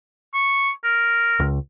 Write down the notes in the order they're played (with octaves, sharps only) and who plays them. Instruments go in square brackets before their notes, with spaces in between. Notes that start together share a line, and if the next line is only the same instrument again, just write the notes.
[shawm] C#6
A#4
[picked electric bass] C#2